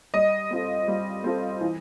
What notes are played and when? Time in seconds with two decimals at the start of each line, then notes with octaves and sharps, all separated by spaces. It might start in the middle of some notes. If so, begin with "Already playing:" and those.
0.14 G3 D#5
0.51 C4 F4 A4
0.88 G3
1.24 C4 F4 A4
1.61 E3